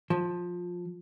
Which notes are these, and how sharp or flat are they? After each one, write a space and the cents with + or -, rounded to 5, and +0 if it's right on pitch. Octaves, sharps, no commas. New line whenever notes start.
F3 +15